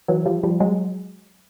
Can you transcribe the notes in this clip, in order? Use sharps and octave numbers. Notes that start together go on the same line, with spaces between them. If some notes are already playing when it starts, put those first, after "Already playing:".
E3 F#3
F3 G3
F3 G3
F#3 G#3